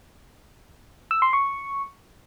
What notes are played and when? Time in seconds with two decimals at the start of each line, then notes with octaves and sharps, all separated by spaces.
1.11 E6
1.22 C6
1.33 C#6